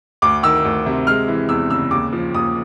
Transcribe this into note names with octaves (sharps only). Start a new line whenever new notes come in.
D2 D6
D#3 E6
D2
C3
G#3 F6
E3
E2 E6
C#3 E6
D#2 D6
F3
D#2 D#6